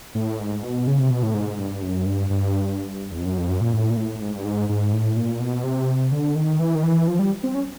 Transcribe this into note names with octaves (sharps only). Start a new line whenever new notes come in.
A2
G#2
B2
C#3
C3
B2
A2
G#2
G2
F#2
G2
G2
E2
F2
F#2
F2
F#2
A#2
A2
A#2
A2
G#2
G2
G#2
G#2
A2
A#2
B2
C3
D3
D#3
E3
D#3
E3
F3
G3
C4
C#4